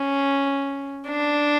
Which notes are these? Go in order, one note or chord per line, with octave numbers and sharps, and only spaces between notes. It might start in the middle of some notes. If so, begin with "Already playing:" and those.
Already playing: C#4
D4